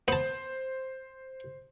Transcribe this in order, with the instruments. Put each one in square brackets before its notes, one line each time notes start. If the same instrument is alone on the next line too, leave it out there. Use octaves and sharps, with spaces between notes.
[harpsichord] B3 A5 [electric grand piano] C5